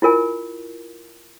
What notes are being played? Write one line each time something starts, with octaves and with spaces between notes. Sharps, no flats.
E4 F4 A#4 G#5